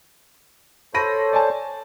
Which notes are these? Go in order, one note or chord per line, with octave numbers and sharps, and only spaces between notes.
A4 C5 C#5 B5 A#6 D#7
D5 G#5 A5